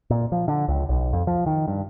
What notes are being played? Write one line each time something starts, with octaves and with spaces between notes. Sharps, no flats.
A#2
F3
D3
C#2
B1
F2
F3
D#3
G2